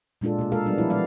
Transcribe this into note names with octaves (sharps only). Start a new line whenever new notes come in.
A#2 G#3 D4 F4 A4
B2 G#4
G#3 A4 A#4 F5
F#3 G3 B3 D4
F3 E4
E3 F#3 G#3 B3 D5 F5